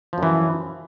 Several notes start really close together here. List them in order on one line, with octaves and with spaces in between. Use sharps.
F3 F#2 E3